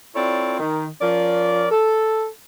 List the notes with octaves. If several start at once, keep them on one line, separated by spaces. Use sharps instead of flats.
C4 E4 F4 A4 C#5 D5
D#3
F3 C#4 A#4 D5
A4